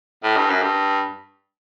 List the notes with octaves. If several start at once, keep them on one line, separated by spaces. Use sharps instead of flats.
A2
G2
F#2
G2